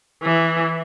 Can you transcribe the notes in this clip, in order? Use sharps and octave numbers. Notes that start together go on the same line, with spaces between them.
E3